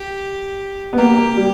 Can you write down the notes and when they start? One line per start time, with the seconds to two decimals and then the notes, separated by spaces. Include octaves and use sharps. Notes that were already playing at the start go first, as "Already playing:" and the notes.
Already playing: G4
0.93 B3
0.98 A#3 G4
1.17 A#3
1.37 G3